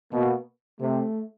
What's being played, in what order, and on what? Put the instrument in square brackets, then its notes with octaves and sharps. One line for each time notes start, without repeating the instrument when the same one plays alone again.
[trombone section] B2 [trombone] A#3
[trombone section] C3 [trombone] A3